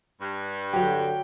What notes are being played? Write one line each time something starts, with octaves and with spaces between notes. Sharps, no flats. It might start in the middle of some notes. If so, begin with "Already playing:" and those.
G2
D3 F#3 G4 G5